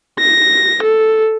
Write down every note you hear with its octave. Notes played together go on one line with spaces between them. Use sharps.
A#6
A4